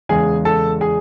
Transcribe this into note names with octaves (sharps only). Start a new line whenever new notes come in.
E2 C#3 G#3 G#4 G#5
A4 A5
G#4 G#5